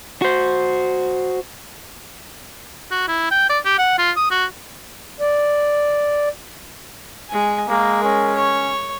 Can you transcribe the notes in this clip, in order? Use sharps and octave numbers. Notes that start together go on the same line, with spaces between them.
F#4 C5
F#4
E4
G5
D5
G4
F#5
F4
D#6
F#4
D5
G#3 G#5
G#3 A#3 A#4
C#4
C#5